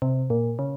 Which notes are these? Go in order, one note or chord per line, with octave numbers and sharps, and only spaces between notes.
C3
A#2
C#3